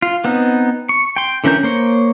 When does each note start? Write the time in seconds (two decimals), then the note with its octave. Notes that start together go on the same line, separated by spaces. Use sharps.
0.02 F4
0.24 B3 C4 D#4
0.89 C#6
1.16 G5 C6
1.44 D3 E3 C#4 A#4 G6
1.63 A#3 C5 C#5